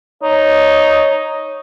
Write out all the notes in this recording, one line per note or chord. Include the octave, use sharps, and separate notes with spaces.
D#4 C#5